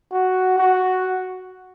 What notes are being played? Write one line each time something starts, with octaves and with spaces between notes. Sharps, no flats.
F#4
F#4